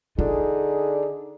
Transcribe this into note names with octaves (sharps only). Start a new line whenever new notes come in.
D3 D#4 F4 G#4